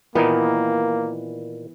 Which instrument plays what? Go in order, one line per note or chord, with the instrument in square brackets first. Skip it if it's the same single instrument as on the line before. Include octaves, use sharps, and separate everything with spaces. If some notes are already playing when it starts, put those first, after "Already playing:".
[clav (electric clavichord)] A#2 D#3 D#4 [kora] E3 B3 [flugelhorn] A#3